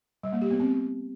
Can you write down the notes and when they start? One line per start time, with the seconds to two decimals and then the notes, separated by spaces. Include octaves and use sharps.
0.23 G3
0.33 A#3
0.42 G4
0.51 B3
0.60 C4